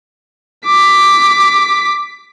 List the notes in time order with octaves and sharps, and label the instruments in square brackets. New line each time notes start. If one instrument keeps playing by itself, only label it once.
[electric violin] D6 B6